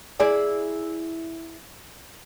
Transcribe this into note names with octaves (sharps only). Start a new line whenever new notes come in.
E4 G#4 D5